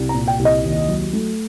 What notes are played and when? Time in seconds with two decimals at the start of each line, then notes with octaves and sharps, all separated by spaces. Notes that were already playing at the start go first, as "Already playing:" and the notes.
Already playing: C2
0.09 A#5
0.14 A#2
0.28 G5
0.39 C2
0.45 D#5
0.64 D#2
0.88 F#3
1.13 A3